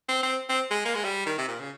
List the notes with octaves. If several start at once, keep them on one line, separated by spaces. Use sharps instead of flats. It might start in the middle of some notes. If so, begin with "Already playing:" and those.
C4
C4
C4
G#3
A#3
G#3
G3
D#3
C3
A#2
C#3